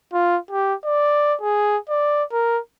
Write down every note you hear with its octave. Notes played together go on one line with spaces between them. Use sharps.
F4
G4
D5
G#4
D5
A#4